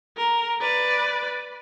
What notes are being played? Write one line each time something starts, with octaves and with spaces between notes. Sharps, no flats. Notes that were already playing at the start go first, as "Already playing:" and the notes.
A#4
B4 D5